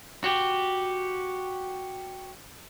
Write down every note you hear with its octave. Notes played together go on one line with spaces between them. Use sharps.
F#4 G4